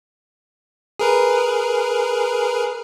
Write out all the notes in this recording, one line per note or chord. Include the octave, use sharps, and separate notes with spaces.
G#4 A#4 B4